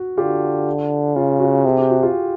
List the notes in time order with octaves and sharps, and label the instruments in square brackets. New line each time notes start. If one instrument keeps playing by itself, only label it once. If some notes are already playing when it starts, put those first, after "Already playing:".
Already playing: [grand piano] F#4
[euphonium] D3 [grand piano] F4 G4
[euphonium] C#3 [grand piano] F4
[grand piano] F#4
[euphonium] C3 [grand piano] G#4
[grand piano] G4
F#4
F4 G4